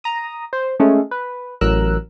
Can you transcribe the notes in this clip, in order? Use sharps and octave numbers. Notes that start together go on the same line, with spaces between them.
A#5 D#6
C5
G#3 A3 C#4 A4
B4
A1 F#3 A#4 E6 F#6